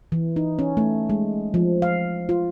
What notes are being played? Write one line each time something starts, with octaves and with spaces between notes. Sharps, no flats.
E3
D#4
C#4
A3
G#3
F3
F5
F4